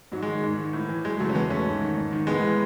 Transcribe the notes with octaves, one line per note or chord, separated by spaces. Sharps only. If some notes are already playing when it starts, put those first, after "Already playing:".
G#2 F#3
G#3
D#3
G#2
D#3
A2
E3
F#2 G#3
C#3 E3 F#3 A3
C#4
E2 G#3 B3
B2 A3 C#4
G#2
D#3
G#2
D#3
A2 G#3 B3
E3